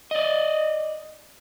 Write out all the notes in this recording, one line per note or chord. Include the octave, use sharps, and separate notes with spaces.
D5 D#5